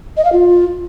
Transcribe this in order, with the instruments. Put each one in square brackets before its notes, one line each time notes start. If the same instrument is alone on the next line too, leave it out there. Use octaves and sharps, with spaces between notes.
[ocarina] D#5
F5
F4